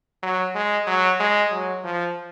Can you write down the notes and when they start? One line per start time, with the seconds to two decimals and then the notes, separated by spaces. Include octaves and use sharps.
0.22 F#3
0.55 G#3
0.87 F#3
1.20 G#3
1.51 F#3
1.84 F3